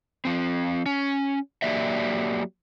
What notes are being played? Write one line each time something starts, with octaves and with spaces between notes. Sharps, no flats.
F3 C4
C#4
F#3 A#3 G4 D5 E5